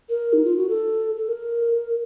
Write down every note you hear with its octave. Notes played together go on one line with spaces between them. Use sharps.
A#4
D#4
F4
F#4
A4
A4
A#4